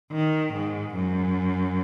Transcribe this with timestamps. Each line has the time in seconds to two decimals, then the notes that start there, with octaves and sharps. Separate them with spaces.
0.12 D#3
0.52 G#2
0.94 F#2